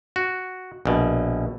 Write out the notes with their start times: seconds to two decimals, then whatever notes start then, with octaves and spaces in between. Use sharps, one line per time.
0.16 F#4
0.86 A#1 B2